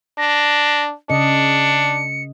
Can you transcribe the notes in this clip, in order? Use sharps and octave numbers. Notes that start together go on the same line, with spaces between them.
D4 A#6
C#3 D4 D#5 C#7